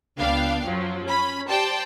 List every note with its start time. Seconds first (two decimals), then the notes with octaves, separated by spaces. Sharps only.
0.18 C#2 B3 D4 F5 G5
0.66 F#2 F3 F#3
1.06 C#4 B5
1.49 G4 C5 D5 G5 A5